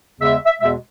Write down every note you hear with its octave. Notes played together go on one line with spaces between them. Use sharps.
E2 C#3 G#3 E5
E5
E2 B2 G#3 E5